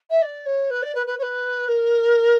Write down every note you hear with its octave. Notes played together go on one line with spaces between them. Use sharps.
E5
D5
C#5
B4
D5
B4
B4
C#5
B4
A#4